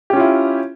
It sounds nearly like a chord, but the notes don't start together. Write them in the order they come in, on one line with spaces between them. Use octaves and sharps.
G4 C#4 F4 E4